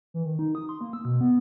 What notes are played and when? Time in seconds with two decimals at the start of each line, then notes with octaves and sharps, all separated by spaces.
0.14 E3
0.26 D#3
0.39 D#4
0.55 D#6
0.69 C6
0.81 A#3
0.93 E6
1.05 B2
1.21 B3